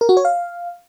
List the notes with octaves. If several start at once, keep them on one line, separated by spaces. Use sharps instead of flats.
A#4
F#4
C#5
F5